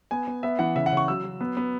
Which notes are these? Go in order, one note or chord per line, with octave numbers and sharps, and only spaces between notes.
B3 G#5
B3
B3 E5
E3 F#5
C#3 E5
F#5
C#3
C#6
F#3 E6
F#3
B3
B3